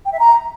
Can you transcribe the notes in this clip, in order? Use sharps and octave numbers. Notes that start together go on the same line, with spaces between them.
G5
E5
A#5